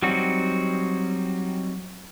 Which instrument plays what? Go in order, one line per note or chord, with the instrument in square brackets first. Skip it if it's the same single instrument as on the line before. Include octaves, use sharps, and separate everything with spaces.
[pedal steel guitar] F#3 G3 C4 D#4 F#4